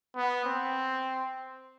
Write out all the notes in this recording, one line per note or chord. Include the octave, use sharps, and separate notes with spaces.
B3
C4